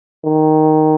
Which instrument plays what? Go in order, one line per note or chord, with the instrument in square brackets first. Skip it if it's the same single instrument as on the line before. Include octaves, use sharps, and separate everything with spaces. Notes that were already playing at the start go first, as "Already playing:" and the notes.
[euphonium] D#3